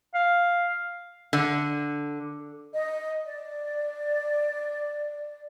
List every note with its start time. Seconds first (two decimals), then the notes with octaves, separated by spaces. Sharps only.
0.14 F5
1.33 D3
2.74 D#5
3.25 D5